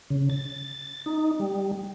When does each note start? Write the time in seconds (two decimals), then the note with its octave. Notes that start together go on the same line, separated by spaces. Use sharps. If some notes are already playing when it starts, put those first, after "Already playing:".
0.10 C#3
0.30 A6
1.06 D#4
1.40 G3